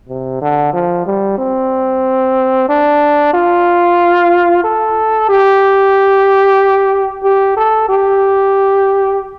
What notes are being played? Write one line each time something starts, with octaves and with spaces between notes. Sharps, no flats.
C3
D3
F3
G3
C4
D4
F4
A4
G4
G4
A4
G4